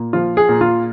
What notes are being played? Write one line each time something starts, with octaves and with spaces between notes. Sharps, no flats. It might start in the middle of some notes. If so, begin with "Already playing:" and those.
Already playing: A#2
F3 F4
G#4
A#2
F4